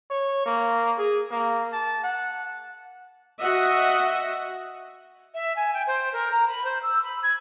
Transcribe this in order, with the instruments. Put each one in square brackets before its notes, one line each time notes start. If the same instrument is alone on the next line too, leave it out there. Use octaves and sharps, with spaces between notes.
[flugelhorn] C#5
A#3
G#4
A#3
A5
F#5
[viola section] F#4 D#5 E5 F#5
[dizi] E5
G#5
G5
C5
A#4
A#5
B5
C5
E6
B5
G#6